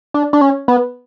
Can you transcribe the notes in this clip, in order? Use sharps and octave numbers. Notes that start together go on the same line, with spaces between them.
D4
D4
C#4
B3